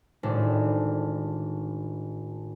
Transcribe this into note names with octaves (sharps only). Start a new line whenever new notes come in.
G#1 A2 D4